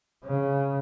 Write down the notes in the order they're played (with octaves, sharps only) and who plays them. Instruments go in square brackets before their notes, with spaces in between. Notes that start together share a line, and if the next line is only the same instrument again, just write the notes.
[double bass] C#3